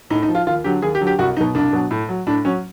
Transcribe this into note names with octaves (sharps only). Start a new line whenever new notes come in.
A2 D#4
D#4
F3
F4
D#2 F4
D3 F#3 G4
D#2 G#4
G4
D3 F#3
G4
C2 F#4
B2 F#3 D#4
C2 D4
B2 F#3
A2
F#3
A2 D4
F#3 C#4